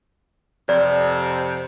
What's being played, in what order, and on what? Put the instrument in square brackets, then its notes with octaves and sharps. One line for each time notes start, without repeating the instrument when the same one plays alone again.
[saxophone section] F2 C3 [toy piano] D5